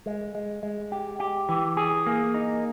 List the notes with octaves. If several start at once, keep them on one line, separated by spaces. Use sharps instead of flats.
G#3
G#3
G#3
G4
G4
E3
G#4
A#3
D#4